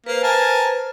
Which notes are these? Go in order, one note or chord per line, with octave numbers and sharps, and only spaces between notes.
A#3 B4 C5
A#4 G#5 A5